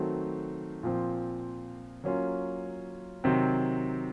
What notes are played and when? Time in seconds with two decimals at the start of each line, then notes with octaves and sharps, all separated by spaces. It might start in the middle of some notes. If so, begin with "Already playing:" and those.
Already playing: D#3 F#3 A3 C4 F#4
0.83 A#2 F3 C4
2.04 F#3 A#3 C#4 F4
3.24 C3 D#3 F#3 C4